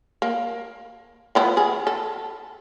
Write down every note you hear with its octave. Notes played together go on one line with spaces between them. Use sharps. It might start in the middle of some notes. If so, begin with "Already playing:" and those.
A#3
F3 B3 E4
G#4
A4